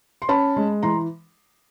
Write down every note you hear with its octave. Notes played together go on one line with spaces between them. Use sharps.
C6
C#4 A5 B5
G#3
E3 A#5 C6